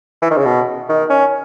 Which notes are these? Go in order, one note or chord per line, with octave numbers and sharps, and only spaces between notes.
E3
D#3
C#3
B2
D#3
C#4